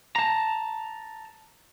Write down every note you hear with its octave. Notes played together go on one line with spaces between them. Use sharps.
A5 A#5